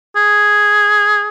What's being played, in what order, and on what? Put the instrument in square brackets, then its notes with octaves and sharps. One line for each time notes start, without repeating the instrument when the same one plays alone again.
[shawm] G#4